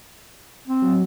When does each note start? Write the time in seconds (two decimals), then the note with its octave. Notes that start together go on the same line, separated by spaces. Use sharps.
0.67 C4
0.82 F#3